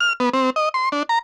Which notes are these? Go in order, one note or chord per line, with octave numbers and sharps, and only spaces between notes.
F6
B3
C4
D#5
C6
D4
A#5